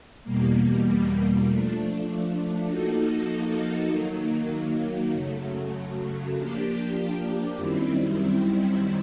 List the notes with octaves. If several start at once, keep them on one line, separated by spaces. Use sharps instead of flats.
E2 B2 G3 A#3
F3 A3 D4
F3 A#3 D#4 F#4 A4
D#3 F#3 A#3
F#2 C#3 F#3 A3
F3 A#3 D4 G4
F#2 D#3 G3 C4 E4